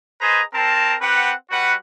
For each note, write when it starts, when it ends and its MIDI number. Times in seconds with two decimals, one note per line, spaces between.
0.21 0.41 68
0.21 0.41 71
0.21 0.41 72
0.21 0.41 75
0.21 0.41 80
0.21 0.41 82
0.53 0.94 60
0.53 0.94 70
0.53 0.94 81
1.01 1.32 60
1.01 1.32 67
1.01 1.32 71
1.01 1.32 78
1.51 1.74 55
1.51 1.74 66
1.51 1.74 71
1.51 1.74 78